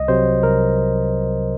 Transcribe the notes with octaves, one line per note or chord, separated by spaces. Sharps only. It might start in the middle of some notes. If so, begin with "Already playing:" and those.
Already playing: C2 D#5
C3 F#3 C5
C2 A#4